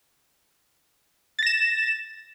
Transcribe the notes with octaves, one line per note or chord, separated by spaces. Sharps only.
A6 A#6 E7